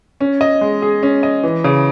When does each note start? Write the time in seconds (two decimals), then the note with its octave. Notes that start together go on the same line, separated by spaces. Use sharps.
0.21 C#4
0.41 D#5
0.61 G#3
0.82 G#4
1.03 C#4
1.23 D#5
1.43 E3
1.64 C#3